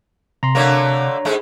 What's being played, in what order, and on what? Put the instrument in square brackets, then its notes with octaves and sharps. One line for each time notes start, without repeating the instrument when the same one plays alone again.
[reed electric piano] C3 [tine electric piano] A#5 C6
[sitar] D3 A3 A#3 [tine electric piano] C#5 A#5
[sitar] G#2 G#3 A3